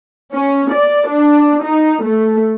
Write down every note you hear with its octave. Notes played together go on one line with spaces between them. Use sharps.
C#4
D5
D4
D#4
A3